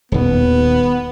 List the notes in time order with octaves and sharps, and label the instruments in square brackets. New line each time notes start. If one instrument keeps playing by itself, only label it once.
[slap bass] D#1 D#2 [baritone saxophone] B3